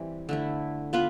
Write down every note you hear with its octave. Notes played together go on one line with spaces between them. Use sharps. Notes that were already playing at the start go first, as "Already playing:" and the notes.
Already playing: E3 G3 C4
D3 A3 E4
B3 F4 B4